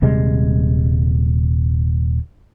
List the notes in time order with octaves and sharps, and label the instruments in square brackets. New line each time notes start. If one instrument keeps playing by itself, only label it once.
[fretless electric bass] D#1 C3 G3 G#3